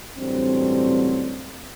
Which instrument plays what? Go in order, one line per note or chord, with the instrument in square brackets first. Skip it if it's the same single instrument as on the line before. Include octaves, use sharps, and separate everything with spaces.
[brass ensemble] A1 G2 D3 F#3 C4